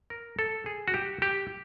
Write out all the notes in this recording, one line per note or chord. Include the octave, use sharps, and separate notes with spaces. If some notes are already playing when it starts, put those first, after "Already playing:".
A#4
A4
G#4
F#4
G4
G4